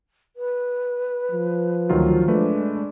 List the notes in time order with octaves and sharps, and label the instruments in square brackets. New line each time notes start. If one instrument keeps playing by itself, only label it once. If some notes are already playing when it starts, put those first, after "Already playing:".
[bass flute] B4
[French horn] F3
[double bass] D2 [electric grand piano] D#3 F#3 F4
[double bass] G#3 D4 [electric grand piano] A3 B4